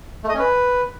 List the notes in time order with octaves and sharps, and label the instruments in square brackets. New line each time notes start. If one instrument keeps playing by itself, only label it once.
[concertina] A3
D#5
C#4
B4